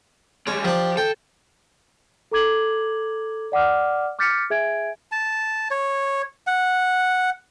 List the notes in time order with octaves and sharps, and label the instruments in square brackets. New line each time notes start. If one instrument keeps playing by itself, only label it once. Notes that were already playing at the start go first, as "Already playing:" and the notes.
[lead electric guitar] G3 G#3 [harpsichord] C#4
[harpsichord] F3 D4 [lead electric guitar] G4
[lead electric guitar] A4 [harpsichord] G5
[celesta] A4 A#5 D6 G#6 F#7
D5 F#5 D6 F6
D6 F6 G6 A6 B6 C#7
G#4 E5 G#5 G#6 D7
[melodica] A5
C#5
F#5